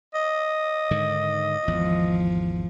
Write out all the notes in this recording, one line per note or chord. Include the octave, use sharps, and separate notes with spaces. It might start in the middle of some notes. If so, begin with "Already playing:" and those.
D#5
G#2 D3 D#3
G#1 E2 F3